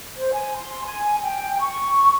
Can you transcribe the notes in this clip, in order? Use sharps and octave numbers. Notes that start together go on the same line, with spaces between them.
C5
G#5
C6
G#5
G5
C#6